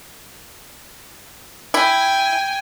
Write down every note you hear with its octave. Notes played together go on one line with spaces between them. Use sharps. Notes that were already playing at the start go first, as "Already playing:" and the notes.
E4 G5 G#5